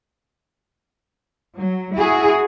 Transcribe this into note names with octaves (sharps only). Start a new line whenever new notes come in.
F#3
E4 F#4 G#4